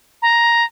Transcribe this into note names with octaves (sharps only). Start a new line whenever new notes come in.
A#5